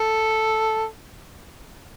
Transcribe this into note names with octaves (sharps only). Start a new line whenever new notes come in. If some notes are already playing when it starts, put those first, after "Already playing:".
Already playing: A4